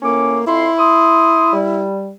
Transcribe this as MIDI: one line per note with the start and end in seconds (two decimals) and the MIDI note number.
0.02 0.40 45
0.02 0.47 58
0.02 0.40 61
0.02 0.40 86
0.47 0.67 41
0.47 1.85 64
0.47 0.67 84
0.78 1.51 84
0.78 1.51 87
1.53 2.12 55